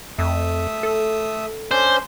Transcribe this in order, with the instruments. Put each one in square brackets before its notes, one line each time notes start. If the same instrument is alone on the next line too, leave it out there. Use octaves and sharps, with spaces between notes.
[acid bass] F2 [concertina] A3 E5 D#6
[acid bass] A4
[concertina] C#4 D4 [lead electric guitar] C5